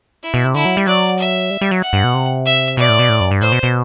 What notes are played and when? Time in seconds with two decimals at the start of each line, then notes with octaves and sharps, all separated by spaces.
0.24 E4
0.34 B2
0.45 C3
0.55 D3 E4
0.65 F#3
0.77 G3
0.87 F#3 D5
1.19 E5
1.50 G3
1.61 G3
1.71 F#3
1.82 F#5
1.93 G2
2.04 B2
2.14 C3
2.46 E5
2.77 B2 D5
2.89 A2
2.99 B2
3.09 A2
3.20 F#2
3.31 G2
3.41 A2 C5
3.52 B2
3.63 B2